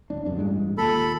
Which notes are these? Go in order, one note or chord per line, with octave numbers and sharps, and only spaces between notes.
D1 D4
F#1 F#2 D4
A1 G2 G#3
D#2 A#2 A4 B5